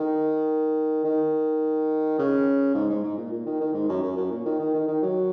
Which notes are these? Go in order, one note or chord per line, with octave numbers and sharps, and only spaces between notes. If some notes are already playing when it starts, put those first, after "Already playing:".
Already playing: D#3
D#3
C#3
G#2
G#2
G#2
A#2
A#2
D#3
D#3
G#2
F#2
F#2
F#2
A#2
D#3
D#3
D#3
D#3
F#3